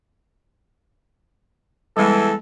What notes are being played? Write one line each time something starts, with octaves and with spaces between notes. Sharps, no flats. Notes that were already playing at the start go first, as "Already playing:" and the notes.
E2 E3 G3 G#3 A4